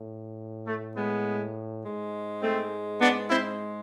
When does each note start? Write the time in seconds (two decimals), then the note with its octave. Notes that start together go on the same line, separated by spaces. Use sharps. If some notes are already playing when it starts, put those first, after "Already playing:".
Already playing: A2
0.67 A3
0.96 G#3 B3
1.83 G#2 G#3
2.42 A3 C4
3.00 B3 D4
3.29 C4 E4